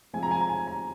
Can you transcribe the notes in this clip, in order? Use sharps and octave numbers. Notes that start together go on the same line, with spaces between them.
F3 G#3 C4 G#5
A#5
G#5
A#5
G#5
A#5